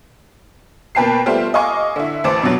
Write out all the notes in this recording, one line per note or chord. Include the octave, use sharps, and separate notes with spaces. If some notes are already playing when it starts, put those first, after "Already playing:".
B2 A#3 B4 G5 A5 C7
G3 A3 B3 F4 G4 C5
D#5 F5 G#5 C#6 D6
D3 E4
A1 E3 C5 A5 D6 D7
G2 B2 F3 F#3